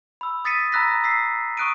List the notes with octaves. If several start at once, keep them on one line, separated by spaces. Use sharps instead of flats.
B5 E6
D#6 A6 B6 C#7 D#7
A#5 B5 E6 F#6 A#6 B6
E6 B6 C7
C#6 D#6 F#6 D7 D#7